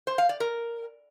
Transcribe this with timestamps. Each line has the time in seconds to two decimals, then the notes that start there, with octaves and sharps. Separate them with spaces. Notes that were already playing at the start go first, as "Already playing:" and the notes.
0.07 C5
0.18 F5
0.29 D5
0.40 A#4